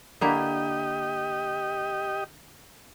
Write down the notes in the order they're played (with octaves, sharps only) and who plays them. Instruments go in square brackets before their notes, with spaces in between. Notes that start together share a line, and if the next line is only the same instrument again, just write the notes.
[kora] D3 A#3 E4 [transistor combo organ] G4 D#5